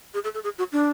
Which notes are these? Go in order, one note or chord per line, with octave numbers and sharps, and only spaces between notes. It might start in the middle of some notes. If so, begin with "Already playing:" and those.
G#4
A4
A4
G#4
F#4
D4